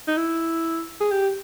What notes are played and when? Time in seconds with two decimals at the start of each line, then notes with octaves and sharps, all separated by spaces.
0.07 D#4
0.17 E4
1.00 G#4
1.11 G4